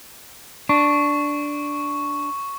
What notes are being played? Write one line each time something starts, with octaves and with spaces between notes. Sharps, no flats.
D4 C#6